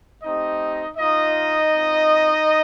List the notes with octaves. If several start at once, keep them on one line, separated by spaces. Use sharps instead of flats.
A3 C4 D#4 G4 D#5
A#3 D#4 F4 D#5
C4 F4